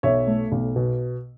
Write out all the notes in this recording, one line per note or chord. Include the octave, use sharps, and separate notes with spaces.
B1 C#5 E5
A3
B1
B2